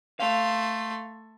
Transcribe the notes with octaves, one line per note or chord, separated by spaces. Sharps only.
A3 F5 C6